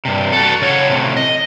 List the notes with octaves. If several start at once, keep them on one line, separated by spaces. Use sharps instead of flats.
G2 C3
F#4 A4
C#3 C#5 F#5
A2 C3
D#5